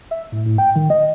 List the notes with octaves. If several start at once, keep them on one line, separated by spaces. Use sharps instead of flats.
E5
A2
A2
G5
D#3
D#5